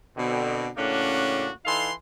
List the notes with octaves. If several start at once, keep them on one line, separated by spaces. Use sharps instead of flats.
B2 D3 C4
A2 C#3 A#3 C#4 D4 F#4
E3 D#4 A4 F5 C6